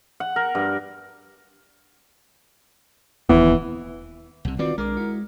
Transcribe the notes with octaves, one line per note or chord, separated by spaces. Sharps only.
F#5
A#4
G2
D1 D#2 E3 B3
C2 C3
D#3 C4 F4 F#4 B4 D5
B1 G#3 D4 A#4 D6
E4 F#4